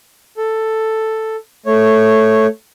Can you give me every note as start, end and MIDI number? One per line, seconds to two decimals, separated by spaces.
0.37 1.36 69
1.66 2.47 57
1.66 2.47 73